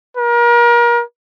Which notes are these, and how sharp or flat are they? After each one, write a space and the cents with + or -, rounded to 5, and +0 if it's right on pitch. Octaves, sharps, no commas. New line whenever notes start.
A#4 +35